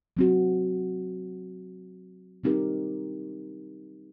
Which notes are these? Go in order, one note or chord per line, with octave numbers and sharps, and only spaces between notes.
F#3 C4 F#4
G3 C4 D#4 G4 A#4